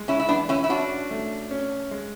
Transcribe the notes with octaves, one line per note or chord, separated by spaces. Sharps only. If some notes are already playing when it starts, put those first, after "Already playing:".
Already playing: G#3
C#4 E4
E4
E3 B3 D4
C#4 E4
E4
C#4 D4 F#4
A3
C#4
G#3